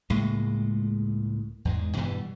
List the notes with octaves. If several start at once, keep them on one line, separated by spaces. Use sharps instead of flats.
C#2 A2 G#3 A#3
E2 G#2 G#3
G2 B2 E3 G3